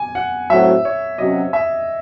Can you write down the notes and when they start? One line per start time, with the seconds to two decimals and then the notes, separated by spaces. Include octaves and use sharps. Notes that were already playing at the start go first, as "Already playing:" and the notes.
Already playing: G#5
0.15 F#5
0.50 A2 F#3 C4 F#4 E5
0.85 C#5
1.18 C3 F#3 C#4 F#4 D#5
1.53 E5